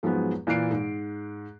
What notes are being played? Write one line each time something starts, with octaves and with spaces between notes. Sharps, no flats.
G#2 F3 F#3 G#3 B3
A#2 E3 F#6 C7 D7
G#2